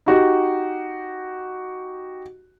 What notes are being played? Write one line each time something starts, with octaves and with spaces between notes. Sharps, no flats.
D#4 F#4 G4